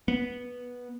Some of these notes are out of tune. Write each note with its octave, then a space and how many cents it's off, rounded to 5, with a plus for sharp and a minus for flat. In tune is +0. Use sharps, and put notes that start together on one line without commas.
B3 -10